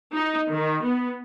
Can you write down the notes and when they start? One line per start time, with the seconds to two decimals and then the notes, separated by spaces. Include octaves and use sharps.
0.16 D#4
0.50 D#3
0.83 B3